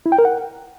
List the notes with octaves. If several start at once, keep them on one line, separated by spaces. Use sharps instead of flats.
E4
G5
A#4
F#5